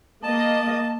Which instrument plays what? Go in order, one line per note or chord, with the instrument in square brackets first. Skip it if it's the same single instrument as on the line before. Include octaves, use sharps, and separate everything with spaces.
[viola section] A#3 D#5 [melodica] A5